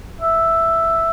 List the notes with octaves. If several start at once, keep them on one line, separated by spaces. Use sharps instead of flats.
E5